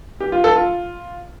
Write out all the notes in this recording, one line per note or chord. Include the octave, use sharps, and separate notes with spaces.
G4
F4
A4
F4